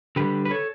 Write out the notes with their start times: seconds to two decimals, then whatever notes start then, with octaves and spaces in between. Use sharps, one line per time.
0.16 D3 G3 G4 B4
0.45 B4
0.51 A4 C#5